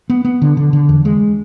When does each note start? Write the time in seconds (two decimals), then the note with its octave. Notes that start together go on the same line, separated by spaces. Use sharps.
0.10 B3
0.25 B3
0.42 D3
0.57 D3
0.73 D3
0.89 E2
1.05 G#3